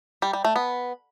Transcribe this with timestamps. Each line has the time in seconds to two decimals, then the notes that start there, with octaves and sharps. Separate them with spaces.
0.22 G3
0.33 G3
0.45 A3
0.56 B3